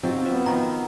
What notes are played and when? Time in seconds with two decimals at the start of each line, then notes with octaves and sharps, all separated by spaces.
0.03 F#3 C4 D#4 F4 G4
0.25 B3 B4 E5
0.46 D#3 F3 A#5